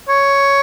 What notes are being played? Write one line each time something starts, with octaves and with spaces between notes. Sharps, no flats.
C#5